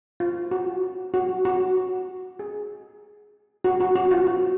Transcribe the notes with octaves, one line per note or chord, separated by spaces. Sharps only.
F4
F#4
F#4
F#4
G#4
F#4
F#4
F#4
F4
F#4